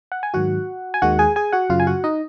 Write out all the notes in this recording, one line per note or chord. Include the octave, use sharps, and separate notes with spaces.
F#5
G#5
G#2 D#3 F#3 F#4 F#5
G#5
D#2 D#3 G#3 F#4 F#5
G#4 G#5
G#4 G#5
F#4 F#5
F#2 C#3 F#3 F4 F5
G#5
F#4 F#5
D#4 D#5